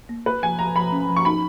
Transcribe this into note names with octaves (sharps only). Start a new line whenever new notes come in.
A#3
A#3 B4
F3 G#5
F3 A#5
F3 B5
C#4
F3
C#6
D#4 B5